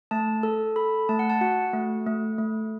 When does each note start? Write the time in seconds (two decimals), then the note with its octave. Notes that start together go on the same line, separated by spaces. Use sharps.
0.11 A3 A5
0.43 A4
0.76 A4 B5
1.09 A3 A5
1.19 F#5
1.30 A5
1.41 F#4 F#5
1.73 A3
2.07 A3
2.38 A3